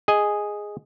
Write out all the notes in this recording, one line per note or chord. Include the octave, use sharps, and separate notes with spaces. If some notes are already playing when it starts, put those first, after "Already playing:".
G#4 D#5 G#5